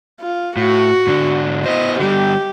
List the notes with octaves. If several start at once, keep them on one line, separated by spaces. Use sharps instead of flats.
F4
A2 F#4
G#2 D3 D4
B3 E4 C5 D#5
D3 G3 G4